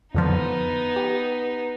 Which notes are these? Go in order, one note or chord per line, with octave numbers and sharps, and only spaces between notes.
F2 D3 F3 B3 D#4
G4